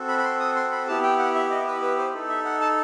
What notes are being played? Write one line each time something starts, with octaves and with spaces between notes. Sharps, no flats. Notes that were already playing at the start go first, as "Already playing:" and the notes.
Already playing: C4 F#4 A4
B5
B5
C6
D#6
C6
B5
B3 E4 G4 A5
G5
F#5
E5
D#5
B4
B4
C5
D#4 A4
E5
F#5
A5